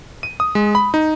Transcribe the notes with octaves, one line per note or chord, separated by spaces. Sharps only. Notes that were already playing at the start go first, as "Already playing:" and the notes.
D#7
D#6
G#3
B5
D#4